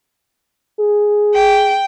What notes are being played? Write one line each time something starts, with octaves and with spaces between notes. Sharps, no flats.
G#4
G5